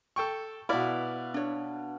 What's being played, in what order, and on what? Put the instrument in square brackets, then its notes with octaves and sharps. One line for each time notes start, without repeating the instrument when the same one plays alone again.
[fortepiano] A4 G5 C#6
[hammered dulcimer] B2 F5 [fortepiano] E4 D5 [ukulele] B4
[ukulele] D4 C#5